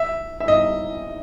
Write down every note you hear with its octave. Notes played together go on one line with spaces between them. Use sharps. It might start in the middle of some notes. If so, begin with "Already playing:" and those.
Already playing: E5
E5
D#5